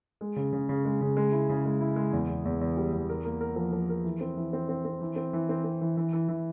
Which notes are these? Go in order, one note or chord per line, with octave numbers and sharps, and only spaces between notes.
G#3
C#3
C#3
C#3
G#3
C#3
G#3
E4
C#3
G#3
E4
G#3
E2
E2
E2
E2
G3
E2
A#4
A#3
A#4
F3
F3
A#4
E3
C4
E3
C4
C4
C4
E3
C4
E3
C4
C4
E3
E3
E3
E3